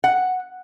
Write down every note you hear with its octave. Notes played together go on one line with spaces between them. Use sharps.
F#5